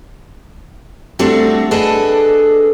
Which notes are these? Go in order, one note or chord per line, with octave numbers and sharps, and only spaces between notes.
G3 A3 C4 D4 F#4
D4 G#4 A4 B4 D#5